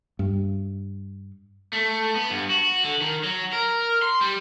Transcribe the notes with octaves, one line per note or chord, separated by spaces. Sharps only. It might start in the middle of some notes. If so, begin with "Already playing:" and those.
G2
A3
B3
G2
F#4
D3
D#3
F#3
A#4
C6
G3